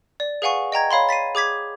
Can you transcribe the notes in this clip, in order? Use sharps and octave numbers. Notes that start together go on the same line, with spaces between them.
D5
G#4 B4 F5 F#5 G#5 C#6
D#5 G5 A#5 G#6
C#5 F5 B5 C6
A6 B6 C7 D#7
G#4 D6 G#6 B6